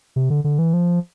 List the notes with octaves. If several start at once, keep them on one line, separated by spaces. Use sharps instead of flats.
C3
D3
D3
E3
F3